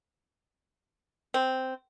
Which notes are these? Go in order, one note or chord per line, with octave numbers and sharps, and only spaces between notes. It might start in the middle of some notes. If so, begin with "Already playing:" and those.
C4